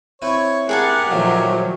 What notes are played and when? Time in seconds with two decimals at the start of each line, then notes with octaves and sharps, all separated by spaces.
0.22 C4 E4 B4 C#5
0.69 G4 G#4 A#4 F#5 G#5 A5
1.11 A#2 D#3 F3 F#3 A3